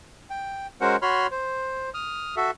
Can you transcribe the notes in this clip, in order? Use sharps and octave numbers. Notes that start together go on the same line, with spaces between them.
G5
G#3 C#4 F#4 A#4 C5 F#5
F#4 C#5 B5 C6 F6
C5
D#6 F6
F#4 A4 E5